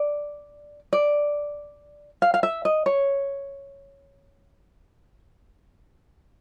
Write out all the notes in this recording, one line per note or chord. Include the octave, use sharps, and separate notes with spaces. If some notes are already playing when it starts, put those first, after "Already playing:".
Already playing: D5
D5
F5
F5
E5
D#5
C#5